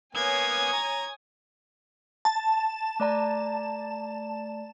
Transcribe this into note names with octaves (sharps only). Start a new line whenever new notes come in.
A#3 B3 C#5 G#5 D#6 G#6
A#5
A5
A3 D5 A#5